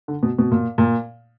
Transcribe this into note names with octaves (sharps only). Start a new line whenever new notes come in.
D3
B2
B2
A#2
A#2